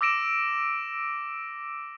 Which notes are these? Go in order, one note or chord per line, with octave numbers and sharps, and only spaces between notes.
D6 E6 A#6 D7 E7